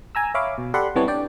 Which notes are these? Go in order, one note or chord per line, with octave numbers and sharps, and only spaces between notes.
G#5 A#5 E6
C#5 E5 F5 B5 D6
B2
G4 A4 D5 F#5 B5 C6
C3 E3 G3 B3 C#5 A5
D4 D5 G5